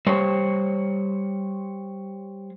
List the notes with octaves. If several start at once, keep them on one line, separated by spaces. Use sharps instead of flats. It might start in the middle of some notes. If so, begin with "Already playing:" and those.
G3 C5 C#5